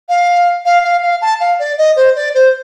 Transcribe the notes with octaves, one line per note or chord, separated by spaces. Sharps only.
F5
F5
F5
F5
A5
F5
D5
D#5
C5
D5
C5